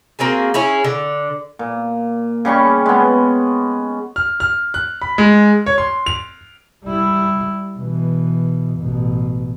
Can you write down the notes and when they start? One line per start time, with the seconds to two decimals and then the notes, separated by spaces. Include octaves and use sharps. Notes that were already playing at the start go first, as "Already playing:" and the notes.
0.19 A#3 C4 F#4 G#4
0.54 C#4 E4 G#4
0.84 D3
1.59 A#2
2.45 C#3 G3 C#4 C#6
2.86 G#3 B3
4.16 F6
4.40 F6
4.74 F#6
5.02 B5
5.18 G#3
5.66 C#5
5.78 C6
6.06 F7
6.84 G3 E4
7.78 B2 E3
8.79 A1 B2